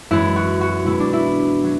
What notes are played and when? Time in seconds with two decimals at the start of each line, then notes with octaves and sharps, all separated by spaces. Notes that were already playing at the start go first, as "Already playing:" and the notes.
0.11 F#2 E3 G#3 E4
0.36 F#4
0.61 F#4
0.85 B2 G#3 E4
1.00 D4
1.13 E4
1.64 F#3